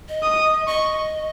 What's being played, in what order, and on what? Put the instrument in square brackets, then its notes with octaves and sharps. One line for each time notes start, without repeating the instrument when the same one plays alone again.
[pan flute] D#5
[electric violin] D#6
[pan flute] D#5 [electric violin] C#6